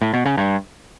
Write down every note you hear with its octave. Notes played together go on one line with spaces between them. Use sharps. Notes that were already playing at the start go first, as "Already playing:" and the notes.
A2
B2
C#3
G2